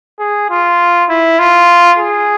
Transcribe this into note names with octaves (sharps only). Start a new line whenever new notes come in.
G#4
F4
E4
F4
G#4